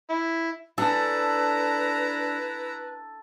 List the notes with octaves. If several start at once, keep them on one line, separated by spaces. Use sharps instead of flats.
E4
D4 E4 A4 B4 A#5